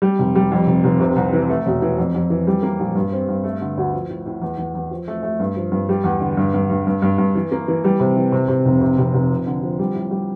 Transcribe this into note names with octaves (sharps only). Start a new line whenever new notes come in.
G3
F1
G3
F2
F1
F1
C3
C2
E3
A3
E1
E3
F2
F2
E3
G3
A#3
A#1
G2
C4
G2
A3
D3
D2
F3
A2
A2
E2
E2
E2
F3
A3
A3
G2
F3
G2
G3
E2
D3
G2
G2
G2
G2
G2
G2
E3
A#3
E3
G3
C3
E3
C3
C3
F1
C3
F1
F1
F3
D3
F3
G3
A2
G3